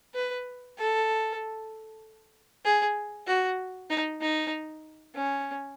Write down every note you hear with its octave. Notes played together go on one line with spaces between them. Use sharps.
B4
A4
G#4
F#4
D#4
D#4
C#4